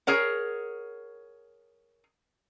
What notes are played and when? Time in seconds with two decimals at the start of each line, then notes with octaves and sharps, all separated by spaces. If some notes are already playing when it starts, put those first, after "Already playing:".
0.07 G#4 A#4 C#5 F#5